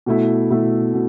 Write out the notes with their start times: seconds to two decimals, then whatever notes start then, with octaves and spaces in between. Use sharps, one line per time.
0.06 B2 A3 E4
0.50 B2 A3 E4
0.94 B2